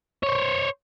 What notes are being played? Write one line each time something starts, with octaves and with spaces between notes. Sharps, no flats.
C5 C#5